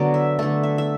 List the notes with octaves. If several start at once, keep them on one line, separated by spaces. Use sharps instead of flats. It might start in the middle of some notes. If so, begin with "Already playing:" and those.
Already playing: D3 F#3 B3 D5
E5
D3 A3 A4
E5
E5